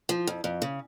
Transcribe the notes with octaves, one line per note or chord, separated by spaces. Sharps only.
F3
F2
F2
C#3